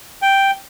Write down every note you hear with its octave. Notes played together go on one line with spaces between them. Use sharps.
G5